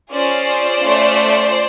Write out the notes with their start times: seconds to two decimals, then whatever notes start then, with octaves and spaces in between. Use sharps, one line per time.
0.11 C#4 F4 G#4 C5 D5
0.81 A3 C#4 F4